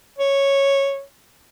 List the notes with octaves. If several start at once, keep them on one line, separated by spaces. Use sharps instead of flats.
C#5